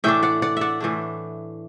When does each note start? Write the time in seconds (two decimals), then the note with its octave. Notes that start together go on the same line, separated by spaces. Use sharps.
0.04 A2 E3 A3 D4 E5 G5
0.23 D5 F#5
0.42 D5 F#5
0.57 D5 E5 F#5
0.80 A2 E3 A3 D4